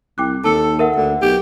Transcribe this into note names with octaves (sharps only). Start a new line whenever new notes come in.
C2 G5 D6 F#6
D#2 A4 A5 E6 C#7
A#4 E5 F#5
D2 D3
B1 G4